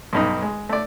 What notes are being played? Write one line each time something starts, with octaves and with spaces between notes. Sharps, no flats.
B1 G2 D#4
G#3
A3 D5